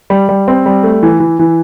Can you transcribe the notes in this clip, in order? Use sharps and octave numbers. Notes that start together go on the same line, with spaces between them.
G3
G3
C4
G3
A3
E3
E3
E3